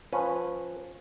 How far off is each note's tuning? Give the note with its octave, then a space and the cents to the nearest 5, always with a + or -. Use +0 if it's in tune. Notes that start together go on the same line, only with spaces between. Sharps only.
F3 +10 C#4 -10 B4 +0